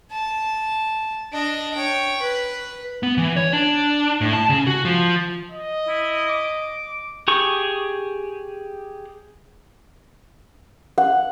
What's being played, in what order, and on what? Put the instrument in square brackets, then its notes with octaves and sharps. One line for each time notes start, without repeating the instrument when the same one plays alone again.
[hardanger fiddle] A5
D4 D#5
C#5 G5
B4
[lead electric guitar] B3
E3
C#5
D4
A2
A5
C#3
F#4
F3
[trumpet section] D#5
[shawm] E4
D6
[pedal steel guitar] G4 G#4 C#6
[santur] F#5